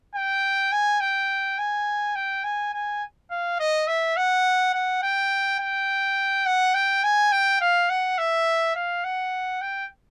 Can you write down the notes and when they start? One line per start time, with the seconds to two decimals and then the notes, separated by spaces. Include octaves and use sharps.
0.16 G5
0.72 G#5
1.01 G5
1.59 G#5
2.16 G5
2.44 G#5
2.74 G#5
3.31 F5
3.60 D#5
3.88 E5
4.17 F#5
4.74 F#5
5.03 G5
5.60 G5
6.46 F#5
6.75 G5
7.04 G#5
7.32 G5
7.61 F5
7.90 F#5
8.18 E5
8.75 F5
9.05 F#5
9.62 G5